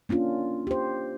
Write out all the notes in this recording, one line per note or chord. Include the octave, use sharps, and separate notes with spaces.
A#3 C#4 D4 F4
G4 C5